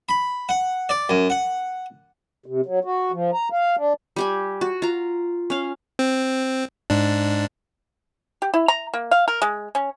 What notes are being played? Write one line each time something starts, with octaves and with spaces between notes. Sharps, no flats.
B5
F#5
D5
F#2
F#5
C3
F#3
F#4
F3
A#5
F5
D4
G3 G4 G#5
F#4
F4 A#5
C#4 F5
C4
G#2 D4
G4
E4
A#5
A#3
F5
A#4
G#3
C#4